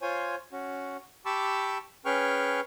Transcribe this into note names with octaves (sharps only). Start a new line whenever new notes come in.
F4 C5 C#5 G#5
C#4 F#4
G4 A5 B5 C#6 D6 E6
C#4 G#4 B4 G5 C#6 F6